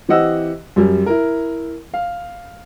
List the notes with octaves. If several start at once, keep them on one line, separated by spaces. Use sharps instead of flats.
E3 C4 G4 D#5 F#5 E6
F#2 G3
E4 A#4
F5